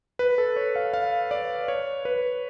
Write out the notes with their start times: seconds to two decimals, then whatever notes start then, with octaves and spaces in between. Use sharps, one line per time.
0.19 B4
0.38 A4
0.56 C#5
0.76 F5
0.94 F5
1.31 D5
1.68 C#5
2.05 B4